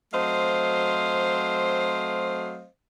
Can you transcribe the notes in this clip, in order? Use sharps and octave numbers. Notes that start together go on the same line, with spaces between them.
F#3 A3 C4 C5 D#5 F5